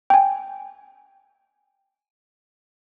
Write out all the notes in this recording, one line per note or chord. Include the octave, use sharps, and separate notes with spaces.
G5 G#5